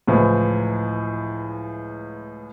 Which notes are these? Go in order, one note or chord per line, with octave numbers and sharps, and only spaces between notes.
C#2 A2 E3 F3